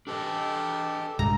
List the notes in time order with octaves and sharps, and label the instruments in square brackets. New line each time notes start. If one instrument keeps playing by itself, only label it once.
[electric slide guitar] D4 B4 D#5 [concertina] G4 A4
[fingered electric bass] G2 C3 G#3 [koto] A#5